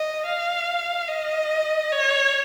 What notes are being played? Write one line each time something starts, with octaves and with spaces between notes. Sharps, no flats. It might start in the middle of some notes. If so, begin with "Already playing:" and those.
Already playing: D#5
F5
D#5
C#5